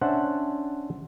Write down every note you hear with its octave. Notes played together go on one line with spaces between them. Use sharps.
C#4 D4 C5 E5 F#5 A5